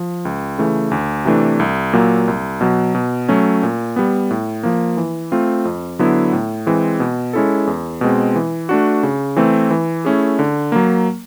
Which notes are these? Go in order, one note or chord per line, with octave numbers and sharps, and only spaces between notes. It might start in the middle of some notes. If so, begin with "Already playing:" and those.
Already playing: F3
C#2
C#3 E3 A3
D2
C3 E3 A3 D4
C2
A#2 F#3 A#3
C2
B2 F#3
B2
F#3 A3 C#4
A#2
G3 B3
A2
F3 A#3
E3
A3 C4 F4
F2
D3 F#3 B3 E4
A2
E3 G#3 C4
B2
G#3 C#4 E4 A4
E2
B2 G#3 C4
E3
A3 D4 F#4
C#3
E3 A3 C4
E3
A3 C#4 E4 G#4
D3
F#3 A#3